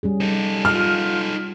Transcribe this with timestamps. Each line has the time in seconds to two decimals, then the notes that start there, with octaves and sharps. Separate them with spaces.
0.03 G3 C#4 G#4
0.21 D#4 A4
0.65 F4 F6